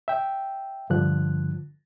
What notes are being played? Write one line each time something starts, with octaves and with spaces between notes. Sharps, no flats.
E5 G5
G2 D3 F3 F#6